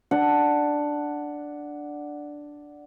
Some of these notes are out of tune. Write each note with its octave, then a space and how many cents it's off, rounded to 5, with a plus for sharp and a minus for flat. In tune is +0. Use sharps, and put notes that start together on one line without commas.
D4 +0 F#5 +0